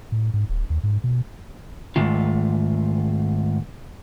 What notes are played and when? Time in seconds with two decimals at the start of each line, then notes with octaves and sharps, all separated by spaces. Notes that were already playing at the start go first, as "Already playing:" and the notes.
0.12 A2
0.34 G#2
0.49 D1
0.70 D#2
0.83 G#2
1.04 B2
1.96 G#2 D#3 A3 F4